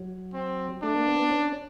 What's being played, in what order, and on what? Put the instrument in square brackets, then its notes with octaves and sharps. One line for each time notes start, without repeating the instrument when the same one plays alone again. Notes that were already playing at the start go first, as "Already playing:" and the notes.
Already playing: [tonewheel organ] F#3
[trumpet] C4
[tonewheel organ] A3 [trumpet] D4
[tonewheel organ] A#3
B3
B3
C#4